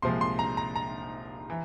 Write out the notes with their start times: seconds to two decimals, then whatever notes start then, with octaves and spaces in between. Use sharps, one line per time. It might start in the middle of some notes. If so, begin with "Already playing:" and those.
0.02 C2 A#2 F3 G#3 C6
0.21 C6
0.39 A#5
0.57 A#5
0.76 A#5
1.50 E3